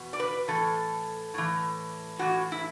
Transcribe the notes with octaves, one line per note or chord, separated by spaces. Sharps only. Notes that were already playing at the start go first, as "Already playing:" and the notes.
Already playing: E2 B2
D5
B4
A2 E3 A4
A2 E3
A2 E3 F#4
E4